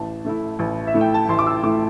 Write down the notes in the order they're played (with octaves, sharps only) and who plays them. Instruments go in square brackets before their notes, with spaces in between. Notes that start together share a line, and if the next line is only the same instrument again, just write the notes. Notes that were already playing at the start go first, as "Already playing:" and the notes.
Already playing: [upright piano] A1 A5
A2 A3 E4
A1
E5
A2 A3 E4
G5
A5
A1 C6
D6
E6
A2 A3 E4 D6